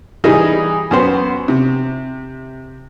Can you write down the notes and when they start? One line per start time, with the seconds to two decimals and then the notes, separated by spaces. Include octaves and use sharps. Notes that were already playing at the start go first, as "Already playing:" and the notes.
0.24 E3 G3 D#4 G#4
0.91 F#2 B3 C5
1.48 C3